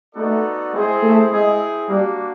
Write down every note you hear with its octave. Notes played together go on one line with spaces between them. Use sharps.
A3 B3 D#4 F#4 A4 D5
G#3 C4 E4 G#4 C5
A3
G#3 C4 E4 G#4
G3 A#3 D4 F#4